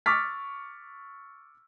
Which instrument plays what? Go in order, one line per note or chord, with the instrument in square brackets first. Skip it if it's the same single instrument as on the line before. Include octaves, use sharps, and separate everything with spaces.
[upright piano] C#6 D6 E6 F6 A6 B6